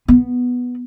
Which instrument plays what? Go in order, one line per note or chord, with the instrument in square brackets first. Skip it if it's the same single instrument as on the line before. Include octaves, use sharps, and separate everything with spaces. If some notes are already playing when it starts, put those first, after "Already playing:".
[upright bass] B3